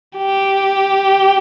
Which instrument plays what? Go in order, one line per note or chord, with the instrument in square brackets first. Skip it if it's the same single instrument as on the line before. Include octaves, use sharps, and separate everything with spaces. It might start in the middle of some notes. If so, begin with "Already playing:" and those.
[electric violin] G4